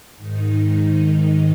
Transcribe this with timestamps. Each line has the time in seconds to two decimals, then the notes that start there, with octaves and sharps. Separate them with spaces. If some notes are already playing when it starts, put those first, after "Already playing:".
0.18 G#2 D#3 D#4
0.58 D#4